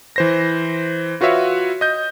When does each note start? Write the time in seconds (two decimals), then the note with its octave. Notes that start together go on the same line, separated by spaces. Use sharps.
0.16 E3 C5 A#6
1.21 F4 F#4 B4 C#5 E5 F5
1.81 D#5 G6